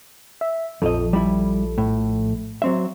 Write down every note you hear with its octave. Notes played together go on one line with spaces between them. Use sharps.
E5
A#1 F2 F3 A4 D#5
G3 E4
A2
F#3 C4 E5